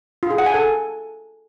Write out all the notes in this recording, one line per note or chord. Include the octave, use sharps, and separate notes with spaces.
F4
G#4
F#5
G#5
A4